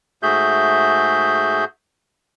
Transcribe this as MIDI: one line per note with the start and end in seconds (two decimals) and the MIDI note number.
0.23 1.65 44
0.23 1.65 57
0.23 1.65 66
0.23 1.65 68
0.23 1.65 76
0.23 1.65 91